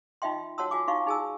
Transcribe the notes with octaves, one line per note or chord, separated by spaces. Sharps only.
D#4 F4 D#5 E5 G5 C6
F#4 C#5 F#5 A5 C6 E6
F4 F#4 G#5 D6
D#4 E4 F#4 F5 C#6
D#4 G#4 G#5 A5 E6